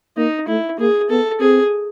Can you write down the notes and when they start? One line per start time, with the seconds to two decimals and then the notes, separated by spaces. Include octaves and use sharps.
0.17 A#3 D#4
0.48 A3 E4
0.79 A#3 G#4
1.10 B3 A4
1.40 C4 G#4